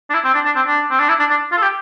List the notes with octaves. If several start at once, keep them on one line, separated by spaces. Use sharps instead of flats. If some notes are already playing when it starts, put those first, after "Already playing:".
D4
E4
C4
D4
D4
C4
D4
C4
D4
E4
D4
D4
F4
A4
G4